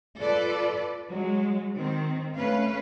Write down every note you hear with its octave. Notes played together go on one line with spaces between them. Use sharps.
F4 A4 B4 D5
F#3 G#3
D#3 C4
A3 C#4 B4 F5